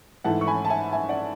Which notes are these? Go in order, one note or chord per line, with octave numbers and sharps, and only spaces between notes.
G#2 E3 A3 E4 F#5 A5
C#6
G#5 B5
A5
E5 G#5
E5 G#5
D5 F#5